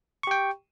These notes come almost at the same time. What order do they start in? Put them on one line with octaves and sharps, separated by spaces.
C#6 G4 G5